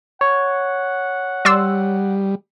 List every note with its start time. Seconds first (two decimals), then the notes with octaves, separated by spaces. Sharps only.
0.21 C#5 F#5
1.45 G3 D5 C6 E6